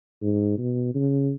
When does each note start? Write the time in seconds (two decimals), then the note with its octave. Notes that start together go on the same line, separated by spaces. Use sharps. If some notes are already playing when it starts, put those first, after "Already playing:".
0.22 G#2
0.58 B2
0.95 C#3